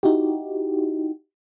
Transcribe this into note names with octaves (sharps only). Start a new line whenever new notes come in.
D#4 E4 F#4 G4